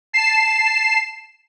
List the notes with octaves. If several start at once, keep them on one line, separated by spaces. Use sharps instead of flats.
A5 C7 E7